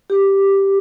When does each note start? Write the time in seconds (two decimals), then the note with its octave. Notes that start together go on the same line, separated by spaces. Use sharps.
0.10 G4